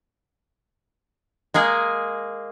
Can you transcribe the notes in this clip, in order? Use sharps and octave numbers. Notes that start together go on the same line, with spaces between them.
G#3 A#3 G#4